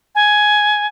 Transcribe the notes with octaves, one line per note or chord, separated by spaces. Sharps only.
G#5